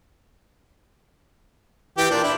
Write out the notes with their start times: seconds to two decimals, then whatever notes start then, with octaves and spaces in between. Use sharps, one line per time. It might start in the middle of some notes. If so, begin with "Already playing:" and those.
1.98 E3 G4 G5
2.11 A#2 D4
2.23 D4 E4